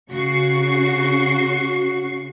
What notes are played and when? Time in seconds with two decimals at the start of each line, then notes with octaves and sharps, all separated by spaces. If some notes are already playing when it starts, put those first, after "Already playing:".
0.12 C#3 F#4 C#6 C7